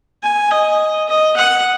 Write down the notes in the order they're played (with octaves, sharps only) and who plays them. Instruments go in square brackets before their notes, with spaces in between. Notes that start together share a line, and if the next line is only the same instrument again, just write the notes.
[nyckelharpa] G#5
D#5
D#5
F#5